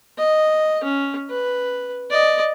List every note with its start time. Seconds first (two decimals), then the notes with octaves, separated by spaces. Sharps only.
0.18 D#5
0.84 C#4
1.30 B4
2.11 D5 D#5